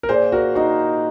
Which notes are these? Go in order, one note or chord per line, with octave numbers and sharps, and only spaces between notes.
A#4
A#2 G#4 C5
F#4 A#4
D#4 F#4